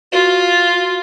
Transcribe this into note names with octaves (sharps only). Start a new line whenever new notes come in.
F4 F#4